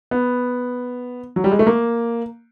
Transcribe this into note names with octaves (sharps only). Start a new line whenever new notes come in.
B3
F#3
G3
G#3
A3
A#3